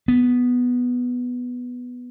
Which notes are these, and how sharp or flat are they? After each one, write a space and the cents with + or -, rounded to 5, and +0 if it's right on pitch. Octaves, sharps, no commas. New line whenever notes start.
B3 +0